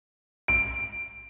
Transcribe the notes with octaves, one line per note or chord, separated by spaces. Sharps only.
D7